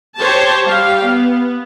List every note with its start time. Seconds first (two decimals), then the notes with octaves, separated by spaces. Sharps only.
0.17 G4 C5 C#5 A5
0.66 G3 G4 F5
1.06 B3